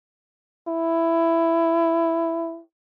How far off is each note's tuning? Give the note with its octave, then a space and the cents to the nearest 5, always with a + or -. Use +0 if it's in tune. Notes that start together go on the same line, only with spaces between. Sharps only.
E4 +10